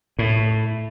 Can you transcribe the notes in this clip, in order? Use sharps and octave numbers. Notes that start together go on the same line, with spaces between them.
A2